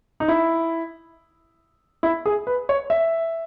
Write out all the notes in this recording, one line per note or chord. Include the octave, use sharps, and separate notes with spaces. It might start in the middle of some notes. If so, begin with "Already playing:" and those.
D#4
E4
E4
G#4
B4
C#5
E5